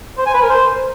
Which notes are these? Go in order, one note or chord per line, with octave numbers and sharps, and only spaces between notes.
C5
G#5
B4
A#4
C5